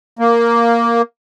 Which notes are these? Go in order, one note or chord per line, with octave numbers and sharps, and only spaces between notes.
A#3